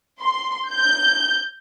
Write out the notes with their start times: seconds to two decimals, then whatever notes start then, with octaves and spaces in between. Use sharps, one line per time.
0.20 C6
0.71 G6